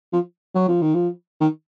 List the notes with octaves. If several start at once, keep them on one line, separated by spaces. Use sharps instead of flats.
F3
F#3
F3
D#3
F3
D#3